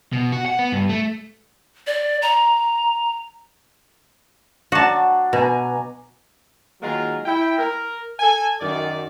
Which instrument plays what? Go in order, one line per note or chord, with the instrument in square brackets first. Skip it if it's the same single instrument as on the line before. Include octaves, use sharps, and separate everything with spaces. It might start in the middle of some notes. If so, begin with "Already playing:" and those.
[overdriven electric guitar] B2
F#4
F#5
B3
G2
A3
[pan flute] D5
A#5
[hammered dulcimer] F#3 D4 [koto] F#4 A5
[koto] B2 [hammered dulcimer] G#5 A#5
[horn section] D#3 F#3 G#3 A#3 F4 A#4
E4 G5
A#4
A4 G#5
F#2 D#3 D5